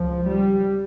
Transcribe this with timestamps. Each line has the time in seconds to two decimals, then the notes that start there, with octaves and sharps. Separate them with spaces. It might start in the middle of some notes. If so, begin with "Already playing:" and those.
Already playing: C#2 F3
0.27 G3